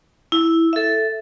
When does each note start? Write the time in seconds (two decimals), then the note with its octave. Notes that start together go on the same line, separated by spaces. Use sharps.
0.32 E4
0.73 A4 E5